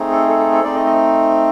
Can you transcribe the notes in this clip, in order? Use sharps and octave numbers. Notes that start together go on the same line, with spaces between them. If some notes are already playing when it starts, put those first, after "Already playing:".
Already playing: A3 C4 D#4 G#4
A4
A4
A4
A4
A3 C4 D#4 D5
D#5
D#5